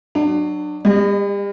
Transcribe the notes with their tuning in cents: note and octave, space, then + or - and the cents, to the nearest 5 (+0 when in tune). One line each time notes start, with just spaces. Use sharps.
F#3 +5 D4 +30
G3 +40 D#5 -25